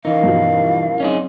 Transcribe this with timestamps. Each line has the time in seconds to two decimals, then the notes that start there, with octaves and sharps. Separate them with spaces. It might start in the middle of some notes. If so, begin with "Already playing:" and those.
0.05 E3 C#4 D#4 E4 A#4 F5
0.23 G2 B2 F3
1.00 F#3 C4 C#4 D#4 G#4